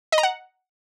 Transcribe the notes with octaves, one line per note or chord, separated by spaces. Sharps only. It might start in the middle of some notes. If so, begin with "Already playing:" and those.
D#5
A#5
F#5